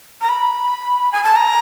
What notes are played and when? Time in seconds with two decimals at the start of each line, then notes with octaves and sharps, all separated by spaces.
0.21 A#5
0.29 B5
1.12 G#5
1.23 A5
1.36 A#5